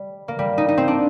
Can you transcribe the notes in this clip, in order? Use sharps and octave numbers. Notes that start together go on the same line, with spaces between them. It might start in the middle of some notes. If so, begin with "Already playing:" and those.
Already playing: G3
A#3
G3
D#4
D#4
C4
D4